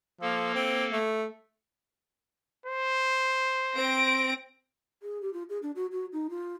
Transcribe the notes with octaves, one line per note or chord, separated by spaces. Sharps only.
F3 A#3 A4
C4
A3
C5
C4 A#6 D7
G#4
G4
F4
G#4
D4
F#4
F#4
D#4
F4